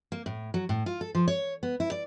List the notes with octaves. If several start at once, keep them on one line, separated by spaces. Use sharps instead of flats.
A#3
A2
F#3
A2
F4
A4
F3
C#5
B3
E4
D5